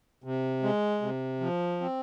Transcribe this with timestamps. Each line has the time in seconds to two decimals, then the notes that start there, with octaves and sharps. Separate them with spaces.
0.24 C3
0.63 G#3
1.01 C3
1.41 F3
1.81 C4